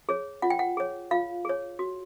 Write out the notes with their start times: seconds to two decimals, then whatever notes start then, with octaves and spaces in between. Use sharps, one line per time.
0.09 G#4 C#5
0.42 F4 F#5
0.50 G5
0.59 F#5
0.77 G#4 C#5
1.11 F4 F5
1.45 G#4 C#5
1.79 F#4